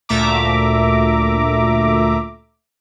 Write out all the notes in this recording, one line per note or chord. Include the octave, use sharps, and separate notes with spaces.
D2 A#2 A3 E5 A#5 D6